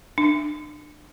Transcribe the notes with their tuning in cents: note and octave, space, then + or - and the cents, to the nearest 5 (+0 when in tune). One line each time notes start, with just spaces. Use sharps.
D4 +30